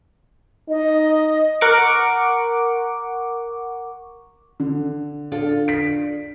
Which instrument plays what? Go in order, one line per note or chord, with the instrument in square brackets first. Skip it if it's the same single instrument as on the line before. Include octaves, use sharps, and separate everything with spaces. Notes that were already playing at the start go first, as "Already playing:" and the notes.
[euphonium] D#4 [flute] D#5
[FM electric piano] A#4 F#5 C#6 D6
[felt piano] D3
[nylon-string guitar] D4 F4 A4
[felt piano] B6 D7